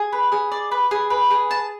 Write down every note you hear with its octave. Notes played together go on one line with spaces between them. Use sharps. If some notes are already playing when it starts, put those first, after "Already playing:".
Already playing: G#4
B4
G#4
D5
B4
G#4
B4
G#4
A5